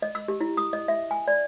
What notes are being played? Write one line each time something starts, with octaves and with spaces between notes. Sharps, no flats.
D#5
E6
G4
E4
D#6
D#5
E5
G#5
D5